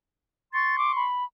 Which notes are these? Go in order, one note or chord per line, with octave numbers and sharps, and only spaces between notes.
C6 C#6 A6
D6
B5